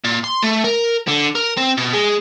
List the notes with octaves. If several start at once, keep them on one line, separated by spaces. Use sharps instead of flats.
A#2
C6
A3
A#4
D3
A#4
C4
B2
G#3